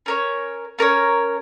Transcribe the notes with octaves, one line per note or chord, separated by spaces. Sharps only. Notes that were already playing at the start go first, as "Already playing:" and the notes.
C#4 A#4 C#5
C#4 A#4 C#5